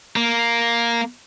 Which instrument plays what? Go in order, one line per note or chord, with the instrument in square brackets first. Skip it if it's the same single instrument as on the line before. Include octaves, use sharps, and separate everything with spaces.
[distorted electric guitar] A#3